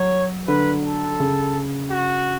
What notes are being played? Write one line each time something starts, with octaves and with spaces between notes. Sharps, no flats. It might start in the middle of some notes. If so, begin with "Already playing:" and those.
Already playing: F#3 C#5
D3 B4
A4
C#3
F#4